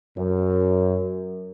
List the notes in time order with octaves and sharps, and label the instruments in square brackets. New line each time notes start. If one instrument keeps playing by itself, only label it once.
[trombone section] F#2